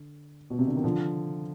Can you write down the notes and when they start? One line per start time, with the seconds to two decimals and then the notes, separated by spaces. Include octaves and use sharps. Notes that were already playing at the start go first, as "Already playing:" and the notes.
Already playing: D3
0.50 B2
0.59 C3
0.67 D3
0.75 D#3
0.84 D3 F3